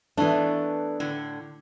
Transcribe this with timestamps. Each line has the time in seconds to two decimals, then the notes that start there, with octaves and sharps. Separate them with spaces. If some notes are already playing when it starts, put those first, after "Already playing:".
0.17 E3 A3 B3 D4
1.00 A2 D3